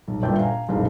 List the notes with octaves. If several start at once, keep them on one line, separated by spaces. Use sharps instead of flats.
B1
G1 A#2 D4 E5 G5
F5 G#5 A#5
F#1 B1 F5